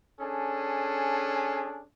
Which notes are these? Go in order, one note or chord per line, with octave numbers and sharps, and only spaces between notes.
C#4 D4 G#4 A4